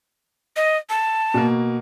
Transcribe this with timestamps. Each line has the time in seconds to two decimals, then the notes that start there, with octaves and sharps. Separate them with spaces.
0.57 D#5
0.90 A5
1.34 B2 A#3